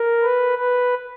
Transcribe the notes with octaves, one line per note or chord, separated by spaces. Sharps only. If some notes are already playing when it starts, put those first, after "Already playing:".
Already playing: A#4
B4
B4